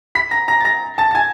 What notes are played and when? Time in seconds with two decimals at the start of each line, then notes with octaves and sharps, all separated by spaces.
0.15 B5 B6
0.31 A#5 A#6
0.48 A#5 A#6
0.61 A6
0.65 A#5 A#6
0.98 A5 A6
1.11 A6
1.15 G#5 G#6